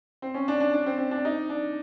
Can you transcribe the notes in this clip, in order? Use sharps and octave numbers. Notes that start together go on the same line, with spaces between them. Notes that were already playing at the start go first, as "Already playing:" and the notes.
C4
C#4
D4
D4
D4
C4
C4
D4
D#4
D4